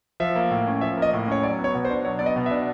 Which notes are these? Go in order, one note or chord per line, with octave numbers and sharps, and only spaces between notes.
F3 E5
A#3
A2
C#4
F3 E5
A#3
D#5
A2
C#4 C#5
F#3 D5
B3
C#5
B2
C5
D4
F#3 C#5
B3 D5
D#5
B2
E5
D4